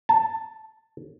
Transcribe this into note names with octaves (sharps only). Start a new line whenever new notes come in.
A5